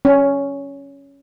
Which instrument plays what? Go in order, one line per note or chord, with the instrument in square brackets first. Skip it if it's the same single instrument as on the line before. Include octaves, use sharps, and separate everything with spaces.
[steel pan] C#4